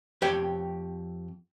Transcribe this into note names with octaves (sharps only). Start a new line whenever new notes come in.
F2 G4 C#5 G5